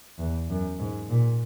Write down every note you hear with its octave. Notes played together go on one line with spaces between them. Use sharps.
E2
F#2
G#2
A#2